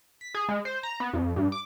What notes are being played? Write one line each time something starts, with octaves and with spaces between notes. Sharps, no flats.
B6
G#4
G#3
C5
A#5
B3
F2
G2
D6